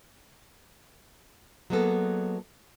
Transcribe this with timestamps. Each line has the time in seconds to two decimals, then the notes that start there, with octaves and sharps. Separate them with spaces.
1.70 F#3 G#3 A#3 B3 A4